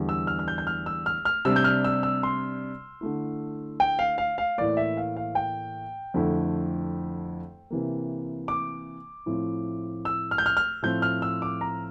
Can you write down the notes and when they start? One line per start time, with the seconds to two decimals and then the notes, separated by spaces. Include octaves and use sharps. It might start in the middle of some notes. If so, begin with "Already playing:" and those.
Already playing: E2 D3 G3
0.09 E6
0.27 F6
0.39 F6
0.48 G6
0.58 G6
0.67 F6
0.86 E6
1.06 F6
1.25 F6
1.45 C3 G3 D4 E6
1.56 G6
1.64 F6
1.85 E6
2.03 E6
2.23 C6
3.01 D3 A3 E4
3.80 G5
3.99 F5
4.18 F5
4.38 F5
4.58 A2 E3 A#3 D5
4.77 E5
4.97 F5
5.16 F5
5.35 G5
6.14 F2 D3 A3 E4
7.70 C3 E3 A#3
8.48 D6
9.26 A2 F3 C4 E4
10.05 E6
10.31 F6
10.38 G6
10.46 F6
10.57 F6
10.82 A2 F3 C4 G6
11.02 F6
11.22 E6
11.42 D6
11.61 A#5